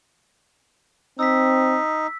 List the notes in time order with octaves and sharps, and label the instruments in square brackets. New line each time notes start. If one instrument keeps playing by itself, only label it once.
[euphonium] C4 [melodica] D#4 [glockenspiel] E6 B6